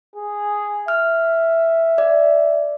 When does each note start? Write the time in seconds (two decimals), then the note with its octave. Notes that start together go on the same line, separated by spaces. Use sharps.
0.16 G#4
0.88 E5 F6
1.98 D5